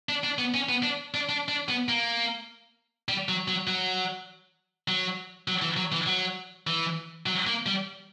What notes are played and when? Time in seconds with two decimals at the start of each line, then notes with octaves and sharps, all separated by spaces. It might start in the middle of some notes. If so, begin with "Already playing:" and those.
0.09 D4
0.24 D4
0.39 B3
0.54 C#4
0.69 B3
0.83 D4
1.14 D4
1.29 D4
1.48 D4
1.69 B3
1.89 A#3
3.09 G3
3.29 F#3
3.48 F#3
3.67 F#3
4.88 F#3
5.48 F#3
5.62 E3
5.77 F#3
5.92 E3
6.07 F#3
6.67 E3
7.26 F#3
7.47 A#3
7.66 G3